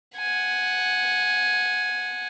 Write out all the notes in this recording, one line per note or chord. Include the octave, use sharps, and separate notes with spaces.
F#5 G#5